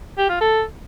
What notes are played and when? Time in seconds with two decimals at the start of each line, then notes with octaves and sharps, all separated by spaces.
0.18 G4
0.29 F4
0.41 A4